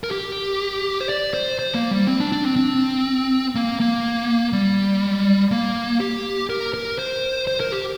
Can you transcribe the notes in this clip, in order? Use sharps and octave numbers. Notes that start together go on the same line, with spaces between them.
A#4
G4
C5
D5
C5
C5
A#3
G3
C4
D4
D4
C4
C4
A#3
A#3
G3
A#3
G4
A#4
A#4
C5
C5
A#4
G4